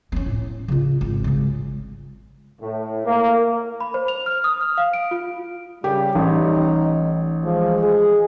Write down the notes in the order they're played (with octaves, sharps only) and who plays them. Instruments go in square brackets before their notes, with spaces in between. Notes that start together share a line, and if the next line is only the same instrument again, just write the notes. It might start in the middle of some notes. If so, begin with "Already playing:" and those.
[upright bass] C4 C#4
A2
C#3 F4
G#1
C#3 G#3
[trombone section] A2
A#3
[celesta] B5
C5
F7
F6
D#6
F6
F5
D7
F4
[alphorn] C#3 [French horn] G3 [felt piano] G4
[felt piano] A1 [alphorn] D#4
[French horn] F3 [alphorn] G#3
[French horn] G#4